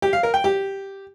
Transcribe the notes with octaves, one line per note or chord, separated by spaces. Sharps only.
G4
F5
A#4
G5
G4